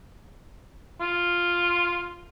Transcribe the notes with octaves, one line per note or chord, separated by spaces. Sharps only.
F4